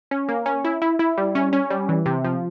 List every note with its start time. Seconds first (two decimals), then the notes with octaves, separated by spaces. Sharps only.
0.11 C#4
0.29 A#3
0.46 C#4
0.64 E4
0.82 E4
0.99 E4
1.17 G3
1.35 C#4
1.53 C#4
1.70 G3
1.89 E3
2.06 C3
2.24 F3